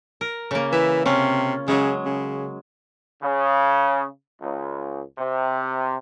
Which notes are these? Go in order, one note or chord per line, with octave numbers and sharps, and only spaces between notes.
A#4
C#3 A#3
E3 E5
C3 C#4 F4
C#3 F#3 G#3
C#3
C#3
C#2
C3